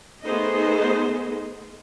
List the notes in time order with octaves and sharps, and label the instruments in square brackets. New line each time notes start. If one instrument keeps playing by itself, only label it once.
[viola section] A3 B3 D#4 G#4 C5 D#5